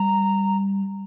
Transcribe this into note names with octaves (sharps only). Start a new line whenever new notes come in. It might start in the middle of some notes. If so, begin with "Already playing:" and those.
Already playing: G3 A#5